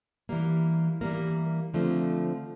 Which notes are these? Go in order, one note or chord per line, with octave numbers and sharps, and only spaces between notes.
E3 G3 A#3
E3 G3 A#3 A#4
D3 F3 A3 C4